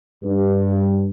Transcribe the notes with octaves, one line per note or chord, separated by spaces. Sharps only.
G2